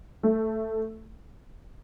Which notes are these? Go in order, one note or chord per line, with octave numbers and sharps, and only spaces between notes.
A3